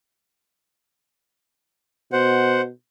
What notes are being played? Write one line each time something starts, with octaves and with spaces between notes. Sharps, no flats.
B2 C5 F#5